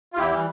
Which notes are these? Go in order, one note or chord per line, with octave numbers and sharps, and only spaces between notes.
F4
E2 E4 G4
E3 G3